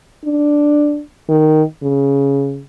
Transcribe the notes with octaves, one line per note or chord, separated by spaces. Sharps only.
D4
D#3
C#3